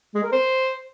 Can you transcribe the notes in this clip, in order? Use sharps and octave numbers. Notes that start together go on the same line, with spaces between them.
G#3
A#4
C5